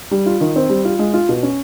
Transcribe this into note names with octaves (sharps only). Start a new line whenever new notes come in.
G3
F4
D#3
C4
G3
F4
G#3
F4
B2
C#4